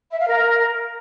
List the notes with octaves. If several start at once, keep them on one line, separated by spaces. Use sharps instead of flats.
E5
F5
A#4